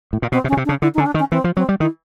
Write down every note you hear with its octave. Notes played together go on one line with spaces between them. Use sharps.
A2
A#2
B2 C4
C3
C#4
C#3
C3
D4
C#3
D3 E4
D#4
D3
C#4
D4
D#3
C#4
E3 C4
F3
F#3 C4
G3
D#3 E4